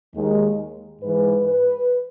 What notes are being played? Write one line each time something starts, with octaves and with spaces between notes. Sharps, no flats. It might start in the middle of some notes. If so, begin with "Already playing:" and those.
D#2 D#3 G#3
G#2 E3 G#3 B4
B4